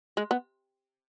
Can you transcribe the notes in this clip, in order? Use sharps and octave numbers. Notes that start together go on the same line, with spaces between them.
G#3
B3